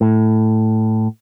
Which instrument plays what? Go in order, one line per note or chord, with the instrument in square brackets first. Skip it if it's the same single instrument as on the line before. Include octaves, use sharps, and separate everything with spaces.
[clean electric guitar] A2